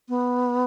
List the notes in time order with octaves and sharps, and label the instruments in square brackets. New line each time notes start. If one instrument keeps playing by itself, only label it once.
[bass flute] B3